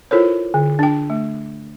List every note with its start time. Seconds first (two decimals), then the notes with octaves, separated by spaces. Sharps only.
0.11 E4 F4 A4 A#4 C5 C#5
0.54 D3
0.79 D4 G5
1.10 A3